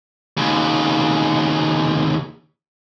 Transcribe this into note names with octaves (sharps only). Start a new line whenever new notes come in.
D#2 C#3